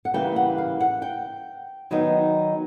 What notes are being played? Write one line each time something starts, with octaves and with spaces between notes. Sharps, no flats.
F#5
C#3 E3 G3 A#3 G5
F#5
F5
F#5
G5
D#3 F#3 B3 D#4